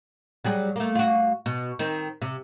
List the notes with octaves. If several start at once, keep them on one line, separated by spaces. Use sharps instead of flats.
F#3 G3 G#4
A3 A#3
F4 F#4
B2
D#3 C4
C3